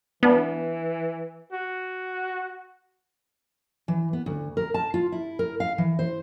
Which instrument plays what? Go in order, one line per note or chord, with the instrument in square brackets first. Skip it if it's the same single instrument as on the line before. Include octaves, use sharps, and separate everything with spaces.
[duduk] E3 [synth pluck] B3 D4
[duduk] F#4
[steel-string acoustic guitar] E3
B3
D2
A#4
A5
F4
E4
A#4
F5
E3
C5